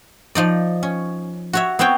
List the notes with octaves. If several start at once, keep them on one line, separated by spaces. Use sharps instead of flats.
F3 D#4 D5
C#4
F#4 C#5 E5
B3 C4 C5 C#5 G5